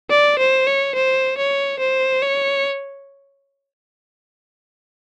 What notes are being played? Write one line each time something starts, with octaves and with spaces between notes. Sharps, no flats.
D5
C5
C#5
C5
C#5
C5
C#5